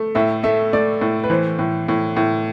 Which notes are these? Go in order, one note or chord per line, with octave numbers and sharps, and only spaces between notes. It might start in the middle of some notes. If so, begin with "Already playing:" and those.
Already playing: A3
A2 E5
A3 E5
A3 D5
A2
B4
E3 C5
A2
A2
A2